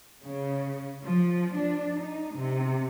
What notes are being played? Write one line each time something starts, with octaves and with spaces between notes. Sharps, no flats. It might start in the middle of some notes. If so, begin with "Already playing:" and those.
C#3
F3
D4
D#4
C3